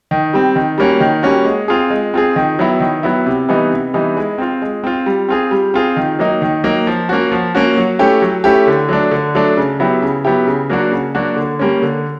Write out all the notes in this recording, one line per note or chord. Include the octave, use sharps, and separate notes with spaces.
D#3
G3 C4
D#3
G3 A#3 C#4 F#4
D#3
G3 A#3 C#4 F#4
G#3
C4 F4 G#4
G#3
C4 F4 G#4
D#3
F#3 B3 E4
D#3
F#3 B3 E4
C3
E3 G3 B3 D#4
C3
E3 G3 B3 D#4
G#3
C4 F4
G#3
C4 F4
G3
C4 F4 G#4
G3
C4 F4 G#4
D#3
F#3 A#3 D#4
D#3
F#3 A#3 D#4
F3
A#3 C#4 F#4
F3
A#3 C#4 F#4
F#3
A3 C#4 E4 G4
F#3
A3 C#4 E4 G4
D3
F#3 A3 D4
D3
F#3 A3 D4
C#3
F#3 B3 E4 G4
C#3
F#3 B3 E4 G4
C#3
F#3 A#3 D4 F#4
C#3
F#3 A#3 D4 F#4
D3
G3 A#3 C#4
D3